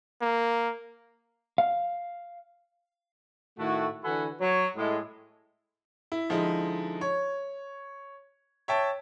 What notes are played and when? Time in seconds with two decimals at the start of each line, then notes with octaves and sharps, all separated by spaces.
0.21 A#3
1.58 F5
3.59 A2 D#3 A3 E4 F#4
4.04 D3 E3 F#4 A4 G#5 B5
4.40 F#3 C#5
4.77 A2 G#3
6.12 E4
6.29 D3 F3 G#3 D#4 E4
7.01 C#5
8.68 C#5 E5 G5 A5